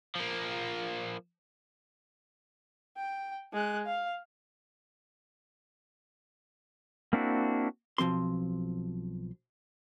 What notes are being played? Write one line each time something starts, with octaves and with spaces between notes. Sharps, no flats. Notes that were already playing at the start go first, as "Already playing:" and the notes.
F3 A#3
G5
G#3 F#6
F5
A#3 C4 D4 E4 F#4
B1 F3 C4 C6